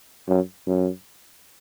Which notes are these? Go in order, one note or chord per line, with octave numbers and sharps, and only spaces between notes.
F#2
F#2